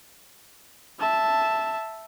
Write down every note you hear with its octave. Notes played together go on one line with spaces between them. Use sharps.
E5 A5